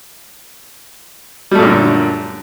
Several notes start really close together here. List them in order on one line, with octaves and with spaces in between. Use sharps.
G3 A3 A#2 F#2 D3